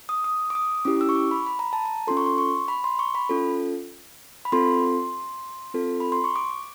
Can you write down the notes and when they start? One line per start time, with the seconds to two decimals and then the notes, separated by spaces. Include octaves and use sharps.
0.09 D#6
0.24 D#6
0.50 D6
0.55 D#6
0.85 C#4 E4 G4 D6
1.01 E6
1.09 C#6
1.16 D6
1.31 B5
1.47 B5
1.59 A#5
1.73 A5
1.86 A#5
2.07 C#4 F4 A4 C6
2.17 C#6
2.26 C6
2.38 C#6
2.68 B5
2.84 C6
2.99 C#6
3.15 B5
3.30 C#4 F4 A4
4.45 B5
4.52 C4 F4 A4 C6
5.74 C4 F4 A4
6.00 B5
6.12 C6
6.24 C#6
6.36 D6